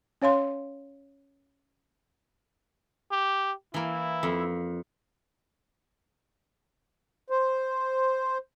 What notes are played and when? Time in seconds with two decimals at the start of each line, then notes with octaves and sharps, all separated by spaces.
0.22 C#4 C#5 F5 C6
3.11 G4
3.74 E3 A#3 E4
4.23 F2
7.30 C5